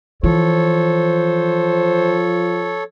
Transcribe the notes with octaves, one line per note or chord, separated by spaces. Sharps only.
E3 F3 A4 C5 C#5